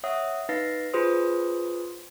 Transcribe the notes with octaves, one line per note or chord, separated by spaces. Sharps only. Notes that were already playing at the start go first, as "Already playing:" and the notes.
C#5 E5 F#5 D#6
D#4 B4 F5 A6 A#6 C7
F4 G#4 B4 C5 C6 D#6